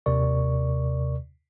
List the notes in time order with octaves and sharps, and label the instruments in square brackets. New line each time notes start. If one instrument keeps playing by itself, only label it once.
[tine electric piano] D#2 C3 A#4 D5 C#6